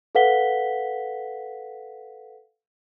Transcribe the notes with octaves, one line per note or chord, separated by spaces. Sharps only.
A4 B4 F5 F#5 B6 G7